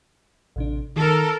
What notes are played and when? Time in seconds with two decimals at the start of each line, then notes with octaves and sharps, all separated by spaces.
0.56 A1 C3 D4
0.96 D#3 A4 A#4